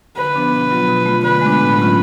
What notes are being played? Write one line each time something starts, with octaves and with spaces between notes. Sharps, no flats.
D3 B4
F3 B3 D4
B2
F#3 B3 F4
B2
A3 F4
D3 B4
G#3 B3 D4
A2
F#3 A3 C#4 F4